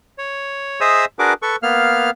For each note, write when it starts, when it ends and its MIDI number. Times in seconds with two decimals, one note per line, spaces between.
0.18 0.81 73
0.81 1.05 68
0.81 1.05 72
0.81 1.05 75
0.81 1.05 76
0.81 1.05 87
0.81 1.05 88
1.19 1.33 62
1.19 1.33 66
1.19 1.33 68
1.19 1.33 70
1.19 1.33 71
1.19 1.33 86
1.42 1.56 69
1.42 1.56 71
1.42 1.56 85
1.63 2.10 58
1.63 2.10 59
1.63 2.10 77
1.63 2.10 89